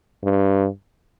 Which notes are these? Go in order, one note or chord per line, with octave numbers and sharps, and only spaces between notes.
G2